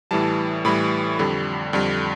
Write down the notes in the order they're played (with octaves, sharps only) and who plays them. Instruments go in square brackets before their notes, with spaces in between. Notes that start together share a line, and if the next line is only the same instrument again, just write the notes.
[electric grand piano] A2 E3 G3 A5
A2 E3 G3 B5
F2 D3 G3
F2 D3 G3